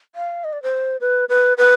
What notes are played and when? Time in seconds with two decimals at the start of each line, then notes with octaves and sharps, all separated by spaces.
0.15 F5
0.44 D#5
0.53 D5
0.63 C5
1.01 B4
1.29 B4
1.58 B4